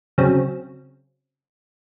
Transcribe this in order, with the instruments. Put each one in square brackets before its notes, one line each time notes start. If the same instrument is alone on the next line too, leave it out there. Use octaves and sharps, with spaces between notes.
[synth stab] C#3 F#3 C4